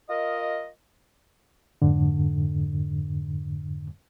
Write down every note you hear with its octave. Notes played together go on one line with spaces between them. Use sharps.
F4 A#4 D#5
F2 G#2 D3